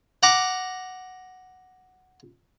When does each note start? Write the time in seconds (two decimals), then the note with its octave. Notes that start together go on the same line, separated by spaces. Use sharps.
0.23 F#5 A#5 D6